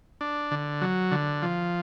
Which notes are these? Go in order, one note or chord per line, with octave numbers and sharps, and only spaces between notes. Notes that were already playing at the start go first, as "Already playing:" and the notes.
D4
D3
F#3
D3
F3